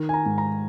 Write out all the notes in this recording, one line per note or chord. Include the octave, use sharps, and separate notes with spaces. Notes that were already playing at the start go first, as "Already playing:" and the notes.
Already playing: D#3
G#5
A#5
G#2
A#5